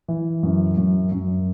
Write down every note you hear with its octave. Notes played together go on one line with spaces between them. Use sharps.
E3
F#2
F#2
F#2